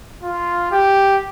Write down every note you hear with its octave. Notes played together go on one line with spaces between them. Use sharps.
F4
G4